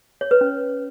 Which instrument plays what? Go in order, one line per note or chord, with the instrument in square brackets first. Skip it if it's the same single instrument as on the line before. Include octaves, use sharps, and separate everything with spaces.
[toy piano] C#5
B4
C#4